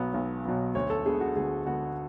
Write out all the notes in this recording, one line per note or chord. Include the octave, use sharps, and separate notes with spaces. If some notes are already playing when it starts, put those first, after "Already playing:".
Already playing: B1 B2 F#3 B3
B1
B2 F#3 B3
D2 C#5
A4
D3 G#3 B3 G#4
F#4
D2 G#4
D3 G#3 B3 F#4